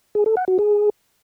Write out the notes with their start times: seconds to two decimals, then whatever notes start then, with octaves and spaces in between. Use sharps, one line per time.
0.15 G#4
0.26 A4
0.37 F#5
0.48 F#4
0.59 G#4